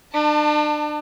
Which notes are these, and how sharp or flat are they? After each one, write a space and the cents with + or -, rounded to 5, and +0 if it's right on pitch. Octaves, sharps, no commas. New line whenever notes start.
D4 +35 A5 +20